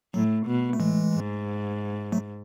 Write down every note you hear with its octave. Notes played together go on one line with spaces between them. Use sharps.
A2 F#3
B2
A3
A2 E3 G#3
G#2
F#3 A3